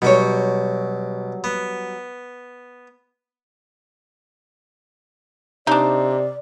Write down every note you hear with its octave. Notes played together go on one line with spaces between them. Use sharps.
B2 F#3 G3 C#5 D6
B3
C3 D4 D#4 D5